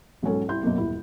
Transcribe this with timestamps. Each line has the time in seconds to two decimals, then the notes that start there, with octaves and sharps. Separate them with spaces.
0.23 B1 G#2 F#3 C#4 A4
0.48 C2 C4 E4 C6 G6
0.63 F#2 B2 F#3 A#3
0.78 D#1 E4